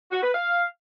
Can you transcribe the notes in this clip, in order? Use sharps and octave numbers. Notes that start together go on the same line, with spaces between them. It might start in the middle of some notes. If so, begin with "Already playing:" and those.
F#4
B4
F5